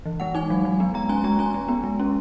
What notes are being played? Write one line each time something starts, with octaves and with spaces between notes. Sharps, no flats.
E3
G#3 F#5
D#4 G#5
F#3
F#3
B3
G#3 A#5
C#4 G#5
G#3 A#5
C#4 G#5
G#3
B3
G#3
C#4